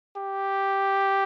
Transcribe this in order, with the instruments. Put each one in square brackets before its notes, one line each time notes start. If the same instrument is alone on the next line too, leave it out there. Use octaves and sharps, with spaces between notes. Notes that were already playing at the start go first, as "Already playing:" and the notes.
[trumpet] G4